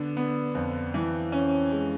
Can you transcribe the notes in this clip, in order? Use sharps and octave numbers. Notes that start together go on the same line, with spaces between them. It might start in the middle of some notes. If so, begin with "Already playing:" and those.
Already playing: D3 B3
B3
F2
E3
C#4
G#3